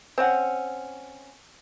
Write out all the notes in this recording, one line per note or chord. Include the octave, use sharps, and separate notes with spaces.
C4 C#4 F#5